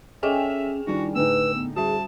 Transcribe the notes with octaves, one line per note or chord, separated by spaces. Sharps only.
C#4 G#4 A4 C#5 D#5 E5 G5 G#5
D#3 G3 D4 E4 F#4
A2 D3 D#4 B4 E6
B3
G3 F#4 G#4 A5